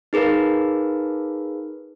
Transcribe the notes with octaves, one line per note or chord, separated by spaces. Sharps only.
D#4 G#4 A#4 B4 F5